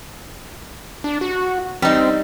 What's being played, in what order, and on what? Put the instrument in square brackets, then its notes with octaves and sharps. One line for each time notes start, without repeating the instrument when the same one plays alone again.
[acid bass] D4
F#4
[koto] G3 D#4 [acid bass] C4